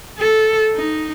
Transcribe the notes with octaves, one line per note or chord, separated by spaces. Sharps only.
A4
D#4